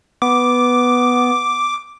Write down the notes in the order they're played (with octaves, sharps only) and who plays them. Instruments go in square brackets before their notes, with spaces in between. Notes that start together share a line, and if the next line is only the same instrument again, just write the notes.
[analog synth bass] B3 [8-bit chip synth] D6